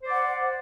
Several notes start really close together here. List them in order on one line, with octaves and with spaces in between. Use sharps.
C5 D5 F#5